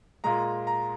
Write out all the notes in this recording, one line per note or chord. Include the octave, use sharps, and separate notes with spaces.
A#2 G#3 A#5
A#5